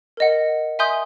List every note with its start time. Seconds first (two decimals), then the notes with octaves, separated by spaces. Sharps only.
0.17 A#4 D#5 F#5
0.79 E5 G#5 C6 D#6 G6